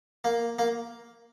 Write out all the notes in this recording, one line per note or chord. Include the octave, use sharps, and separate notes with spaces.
A#3
A#3